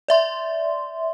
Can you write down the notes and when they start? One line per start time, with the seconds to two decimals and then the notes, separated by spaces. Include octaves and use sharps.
0.08 D5 E5 C6